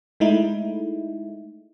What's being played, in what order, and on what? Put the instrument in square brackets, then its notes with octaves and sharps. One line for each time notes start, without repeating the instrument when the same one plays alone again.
[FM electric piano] G#3 A3 D#4 E4